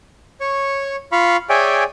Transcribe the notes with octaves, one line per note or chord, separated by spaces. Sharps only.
C#5 C#6
F4 F5 B5 C#6
G#4 C#5 D5 E5 G5 G#5